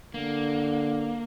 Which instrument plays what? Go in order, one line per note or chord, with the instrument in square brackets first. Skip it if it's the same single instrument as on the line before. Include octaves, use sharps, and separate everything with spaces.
[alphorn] D3 [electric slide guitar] A#3